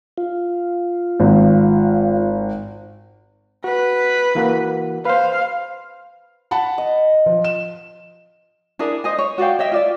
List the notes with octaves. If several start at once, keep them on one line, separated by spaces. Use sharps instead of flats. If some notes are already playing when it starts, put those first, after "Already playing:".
F4
G#1
F#4 B4
E3 A#3 F#4
B4 C5 F5
F#5 A5 B5
D#5
F3
E7
D4 E4 G#4 A#4
C5 D#5 G#5
C#5
F#4 D5 F5 G5
C#5 D#5 E5 G5
F4 D5 E5